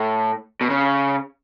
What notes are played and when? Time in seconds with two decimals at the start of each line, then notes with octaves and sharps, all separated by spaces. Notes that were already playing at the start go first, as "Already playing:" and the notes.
Already playing: A2
0.61 B2
0.70 C#3